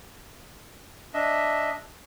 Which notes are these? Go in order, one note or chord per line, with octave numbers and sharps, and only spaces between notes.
D4 D#5 E5